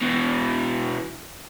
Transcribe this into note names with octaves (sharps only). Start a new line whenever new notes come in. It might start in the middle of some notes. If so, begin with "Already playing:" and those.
B2 E3